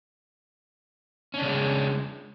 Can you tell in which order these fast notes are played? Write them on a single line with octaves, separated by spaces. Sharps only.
C#4 D4 C#3 G#3